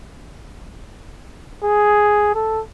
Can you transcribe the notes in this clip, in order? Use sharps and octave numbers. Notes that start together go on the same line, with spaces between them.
G#4
A4